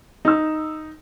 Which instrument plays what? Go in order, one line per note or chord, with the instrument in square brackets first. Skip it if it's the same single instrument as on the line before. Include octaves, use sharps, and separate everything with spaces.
[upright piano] D#4 E6